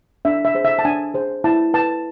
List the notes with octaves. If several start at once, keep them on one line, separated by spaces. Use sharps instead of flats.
D4 E5
E5
G#4 C5
E5
A5
D4 G#5
G#4 C5
E4 A5
B4 A5